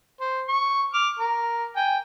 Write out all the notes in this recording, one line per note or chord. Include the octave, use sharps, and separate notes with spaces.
C5
C#6
D6 F6
A#4
G5 G#5